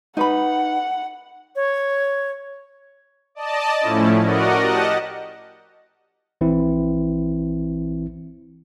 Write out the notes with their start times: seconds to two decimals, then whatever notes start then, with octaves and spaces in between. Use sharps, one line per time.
0.17 D#4 B4 F#5 B5
1.56 C#5
3.35 D5 D#5 A5
3.80 A2 F3 A3 C#4 E4
4.22 F#4 A#4 D5 D#5 F#5
4.60 G4 D#5 F#5 A5
6.41 A#1 E3 C4 E4